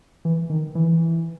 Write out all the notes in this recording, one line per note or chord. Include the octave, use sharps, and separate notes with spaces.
E3
D#3
E3